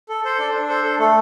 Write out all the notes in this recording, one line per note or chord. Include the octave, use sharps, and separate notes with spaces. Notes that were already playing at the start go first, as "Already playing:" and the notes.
A4
A4 C5
D4 D5
C5
D4
A4 C5
A4
A3 A4